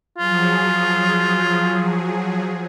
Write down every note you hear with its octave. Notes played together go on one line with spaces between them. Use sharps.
F3 F#3 F4 G#4